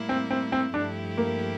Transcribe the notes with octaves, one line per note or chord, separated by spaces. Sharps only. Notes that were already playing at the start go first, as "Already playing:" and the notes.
Already playing: A2 G3 A#3 E4
C4
C4
C4
G2 F3 A3 D4 E4 G4
A#3